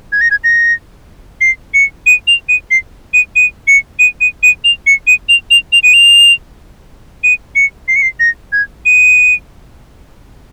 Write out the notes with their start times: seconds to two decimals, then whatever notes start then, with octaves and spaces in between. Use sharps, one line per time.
0.12 G#6
0.21 A#6
0.31 G#6
0.44 A#6
1.41 C7
1.74 C#7
2.06 D#7
2.27 F7
2.49 D#7
2.71 C7
3.14 D#7
3.36 D#7
3.68 C#7
3.99 D#7
4.21 D#7
4.43 D#7
4.64 F7
4.87 C#7
5.07 D#7
5.29 F7
5.51 F7
5.73 F7
5.83 D#7
5.94 F7
7.24 D#7
7.56 C#7
7.88 C7
7.96 C#7
8.02 C7
8.20 A#6
8.52 G#6
8.86 D#7